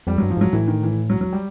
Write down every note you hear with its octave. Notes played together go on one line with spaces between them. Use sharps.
F2 G3
G2 F#3
F3
G#2 F#3
A2 E3
D#3
E3
F#3
F#3
G3